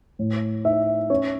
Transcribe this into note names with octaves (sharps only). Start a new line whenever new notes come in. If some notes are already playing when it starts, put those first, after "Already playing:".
A2
D#4 E5
C#4 C#5